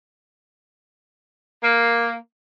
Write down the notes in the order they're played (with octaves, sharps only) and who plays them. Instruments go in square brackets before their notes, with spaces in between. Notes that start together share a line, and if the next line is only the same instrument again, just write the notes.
[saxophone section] A#3